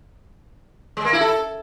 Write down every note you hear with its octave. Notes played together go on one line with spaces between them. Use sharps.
G#3
A#3
E4
A4